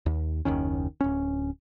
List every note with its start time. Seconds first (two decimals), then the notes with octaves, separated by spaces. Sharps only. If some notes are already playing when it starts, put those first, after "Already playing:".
0.06 D#2
0.45 F#1 D#2 D#3 C#4
1.01 D1 C#4